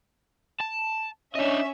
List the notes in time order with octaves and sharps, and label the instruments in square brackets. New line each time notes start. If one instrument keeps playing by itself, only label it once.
[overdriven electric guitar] A5
[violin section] C#4 E5 [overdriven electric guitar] D4 D#5